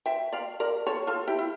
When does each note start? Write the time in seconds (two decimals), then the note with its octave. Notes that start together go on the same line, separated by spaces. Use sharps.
0.06 E5 G5
0.33 D5 F5
0.60 A#4 D5
0.87 A4 C#5
1.07 F4 A4
1.27 E4 G4
1.39 E4